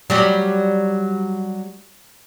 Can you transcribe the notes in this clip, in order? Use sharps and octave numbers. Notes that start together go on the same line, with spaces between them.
F#3 G3 G4